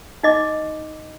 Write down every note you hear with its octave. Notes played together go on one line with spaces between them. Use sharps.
D#4 D#5 D6